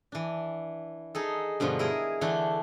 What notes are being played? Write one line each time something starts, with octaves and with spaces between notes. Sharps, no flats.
E3 D4
D#4 G#4 A4
G2 B2 D3 F3
E4 G#4 A#4 D#5
D3 E3 A3 D4